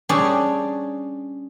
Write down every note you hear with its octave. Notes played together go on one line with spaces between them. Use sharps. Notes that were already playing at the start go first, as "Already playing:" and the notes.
G3 C#4 D4 G4 G#4 D5